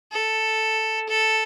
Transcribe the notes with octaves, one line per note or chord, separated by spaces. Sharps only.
A4
A4